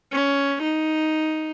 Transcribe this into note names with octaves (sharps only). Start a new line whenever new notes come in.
C#4
D#4